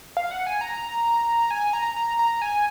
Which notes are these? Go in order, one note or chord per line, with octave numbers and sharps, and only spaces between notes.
F5
F#5
G#5
A#5
G#5
A#5
A#5
A#5
G#5